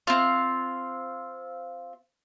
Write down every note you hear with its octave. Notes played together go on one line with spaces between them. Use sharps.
C4 F4